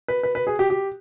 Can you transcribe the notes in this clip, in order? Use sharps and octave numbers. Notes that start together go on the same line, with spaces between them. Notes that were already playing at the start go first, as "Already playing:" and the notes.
B4
B4
B4
G#4
G4
G4